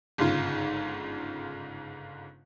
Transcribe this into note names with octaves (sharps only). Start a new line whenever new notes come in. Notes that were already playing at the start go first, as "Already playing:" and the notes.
G1 G#2 C#3 F4